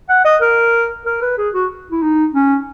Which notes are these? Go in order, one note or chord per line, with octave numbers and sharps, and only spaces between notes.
F#5
D#5
A#4
A#4
B4
G#4
F#4
E4
D#4
C#4